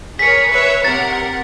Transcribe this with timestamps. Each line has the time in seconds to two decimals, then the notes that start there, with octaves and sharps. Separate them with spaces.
0.19 G#4 A#4 C#5 B6 C#7
0.50 B4 C#5 E5
0.84 C3 A#4 F#5 A6